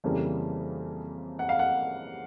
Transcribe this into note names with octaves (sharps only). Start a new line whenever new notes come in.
F2 C#3 E3 G3 A#3
F#5
F5
F#5